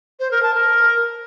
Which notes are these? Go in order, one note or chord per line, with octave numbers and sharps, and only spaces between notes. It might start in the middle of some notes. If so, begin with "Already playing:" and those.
C5
A#4
A5
A#4